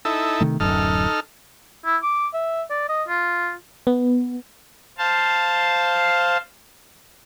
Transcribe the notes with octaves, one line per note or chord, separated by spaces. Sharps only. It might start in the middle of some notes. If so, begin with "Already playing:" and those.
D#4 E4 A4
C3 D#3 A3
D1 F#2 D#4 A4 F6
E4
D6
E5
D5
D#5
F4
B3
C5 F5 A5